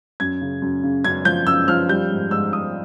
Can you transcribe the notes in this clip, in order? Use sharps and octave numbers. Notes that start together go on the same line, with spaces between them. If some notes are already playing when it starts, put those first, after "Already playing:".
F#2 G#6
C#3
F#2
C#3
F#2 G#6
F3 G6
F#2 E6
F3 F6
G3 G6
G#2
G#2 E6
G#2 D#6